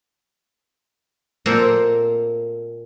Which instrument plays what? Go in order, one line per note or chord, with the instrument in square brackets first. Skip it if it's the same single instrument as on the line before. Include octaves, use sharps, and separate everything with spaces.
[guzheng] A#2 A#3 C4 A4 A#5 C6